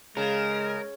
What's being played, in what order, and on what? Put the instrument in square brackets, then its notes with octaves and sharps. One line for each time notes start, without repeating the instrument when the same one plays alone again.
[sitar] C#3 [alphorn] G#3 [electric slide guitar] A#4